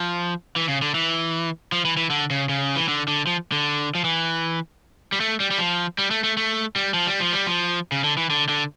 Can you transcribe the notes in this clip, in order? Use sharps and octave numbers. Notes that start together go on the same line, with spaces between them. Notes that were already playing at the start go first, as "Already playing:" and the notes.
Already playing: F3
E3
C#3
D3
E3
F3
E3
E3
D3
C#3
C#3
E3
D3
D3
F3
D3
F3
E3
G3
A3
G3
G3
F3
G3
A3
A3
A3
G3
F3
G3
F3
G3
F3
C#3
D3
E3
D3
D3